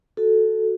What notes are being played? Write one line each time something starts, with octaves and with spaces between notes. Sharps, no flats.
F#4 A4